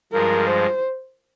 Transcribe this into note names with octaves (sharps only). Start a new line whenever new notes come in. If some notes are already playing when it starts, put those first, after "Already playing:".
G2 F3 G#3 A#4
C5